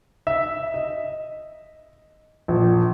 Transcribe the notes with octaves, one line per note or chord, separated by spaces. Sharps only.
E5
D#5
A#1